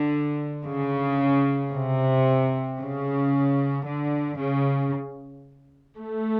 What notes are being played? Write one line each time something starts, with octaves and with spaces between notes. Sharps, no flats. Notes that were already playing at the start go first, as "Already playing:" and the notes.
Already playing: D3
C#3
C3
C#3
D3
C#3
A3